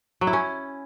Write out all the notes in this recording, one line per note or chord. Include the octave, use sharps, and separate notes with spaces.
F#3
E4
C#4